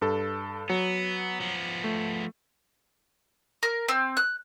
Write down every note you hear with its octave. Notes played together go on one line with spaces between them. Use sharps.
G2 A4
F#3 B3
F3 B3
A3
A#4
C4
F#6